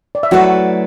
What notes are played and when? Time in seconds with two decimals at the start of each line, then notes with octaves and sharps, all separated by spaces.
0.15 D5
0.23 E5
0.31 F#3 A3 E4 F#4 B4 D5 F#5